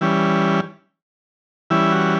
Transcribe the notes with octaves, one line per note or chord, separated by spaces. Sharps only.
E3 G3 C#4
E3 G3 C#4 E4
F#4